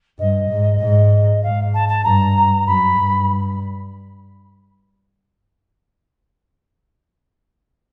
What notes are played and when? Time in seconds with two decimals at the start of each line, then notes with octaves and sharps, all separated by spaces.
0.19 G2 D#5
0.50 G#2
0.80 G#2
1.43 G#2 F5
1.74 A5
1.88 A5
2.04 G2 A#5
2.66 F#2 B5
2.97 G2